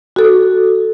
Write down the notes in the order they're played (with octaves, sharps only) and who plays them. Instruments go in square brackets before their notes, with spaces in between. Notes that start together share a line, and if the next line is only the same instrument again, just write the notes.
[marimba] F#4 A4